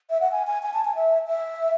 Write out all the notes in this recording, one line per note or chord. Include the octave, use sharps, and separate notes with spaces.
E5
F#5
G#5
G#5
G#5
A5
G#5
E5
E5